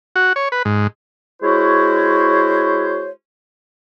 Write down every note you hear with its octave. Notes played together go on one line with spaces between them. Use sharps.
F#4
C#5
B4
G#2
G#3 E4 F#4 C5 C#5